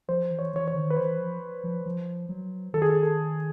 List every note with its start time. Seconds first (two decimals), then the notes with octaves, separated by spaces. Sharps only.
0.08 F3 C5
0.31 E3
0.39 C#5
0.53 E3 C#5
0.68 C#5
0.74 D#3
0.90 B4
0.97 E3 C5
1.18 F3
1.64 F3
1.86 F3
2.29 F#3
2.73 D#3 A4
2.82 G#4
2.89 A4
3.03 A4